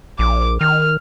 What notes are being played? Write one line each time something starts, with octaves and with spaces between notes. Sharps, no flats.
A#1 D6
D#3 F6